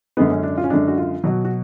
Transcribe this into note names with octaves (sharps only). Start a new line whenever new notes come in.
F#2 D3 G#3 B3
C#4
D4
F4
C#4
F#2 D3 G#3 D4
F#4
F4
B2 F#3 F#4
F#4